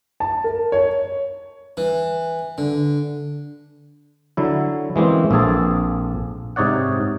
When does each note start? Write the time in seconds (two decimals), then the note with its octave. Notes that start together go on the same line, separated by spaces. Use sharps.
0.20 A5
0.44 A#4
0.72 C#5
1.77 E3
2.58 D3
4.37 D3 F#3 E4
4.96 E3 G#3 A#3 C4 C#4
5.31 A#1 A#3 C4 G#4 A4 A5
6.56 G#2 C3 D#4 C#5 D5 F#5